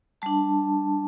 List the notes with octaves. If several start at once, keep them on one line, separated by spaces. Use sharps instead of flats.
G3 D4 A5